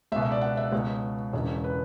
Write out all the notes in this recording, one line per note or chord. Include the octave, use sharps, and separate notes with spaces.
C#2 B2 E5
E5
D5
F#5
E5
C#2 B2 C#5
E1 E2 C#3 C#5
B4